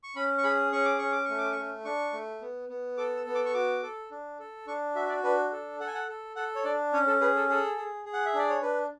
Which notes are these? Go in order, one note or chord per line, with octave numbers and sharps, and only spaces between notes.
C#6
C#4 B5
C#6
G#4 B5
C#4 C#6
D6
C#4 C#6
D6
A3 C#6
D6
A3 C#6
D4 C#6
A3
B3
B3
A4 D6
E6
B3
D6
C#6
F#4 D6
A4
D4
A4
D4 C#6
F#4 E5
E5
D5
D4 B4
A4
A4 F#5
G#5
F#5
A4
A4 F#5
C#5
D4 D5
C#4 C#5
A4
G#4 B4
A4
G#4 A4
G#4
G#4
F#5
E5
D4 D5
C#5
D4 B4